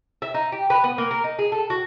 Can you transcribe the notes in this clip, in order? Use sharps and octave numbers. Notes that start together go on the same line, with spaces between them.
E5
D#4
G4
B4
B3
A#3
A#4
D#4
G#4
A4
F#4